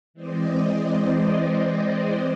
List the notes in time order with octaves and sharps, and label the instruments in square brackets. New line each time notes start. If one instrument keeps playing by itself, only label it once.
[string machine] E3 G#3 C4 C5 D5 D#5